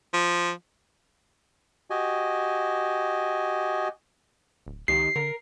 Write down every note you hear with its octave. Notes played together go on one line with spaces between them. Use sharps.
F3
F#4 G4 D#5 G#5
D1
C#2 D#3 D#4 G4 C7
D3 A#4